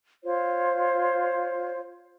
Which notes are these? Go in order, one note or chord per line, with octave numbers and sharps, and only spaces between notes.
F4 C5 C#5